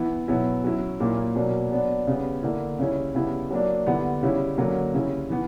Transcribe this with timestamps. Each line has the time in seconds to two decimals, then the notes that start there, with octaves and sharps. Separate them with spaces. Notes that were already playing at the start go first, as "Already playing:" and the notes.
Already playing: E3 B3 E4
0.28 B2 F#3 B3 E4
0.64 F#3 C#4 E4
1.00 A#2 F#3 A#3 E4
1.36 B2 F#3 A#3 D4
1.71 F#3 B3 D4
2.07 C#3 G3 B3
2.43 D3 A#3 E4
2.79 C#3 G3 C#4 E4
3.15 C#3 G3 B3 E4
3.51 F#3 A#3 D4
3.86 D3 G3 B3 E4
4.23 C#3 G3 C#4 E4
4.58 D3 F#3 A#3 C#4
4.94 C#3 G3 C#4 E4
5.30 E3 B3